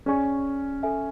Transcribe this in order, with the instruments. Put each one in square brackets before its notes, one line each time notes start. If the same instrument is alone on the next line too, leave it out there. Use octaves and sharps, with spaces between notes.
[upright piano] C#4 [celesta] G#4 D5 G#5 C#6
[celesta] A4 E5 G#5